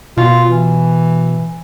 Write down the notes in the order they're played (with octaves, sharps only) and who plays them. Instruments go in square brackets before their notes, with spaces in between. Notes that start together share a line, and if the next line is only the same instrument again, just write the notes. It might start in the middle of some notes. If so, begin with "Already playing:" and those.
[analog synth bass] B2 [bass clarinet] F4
[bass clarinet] E3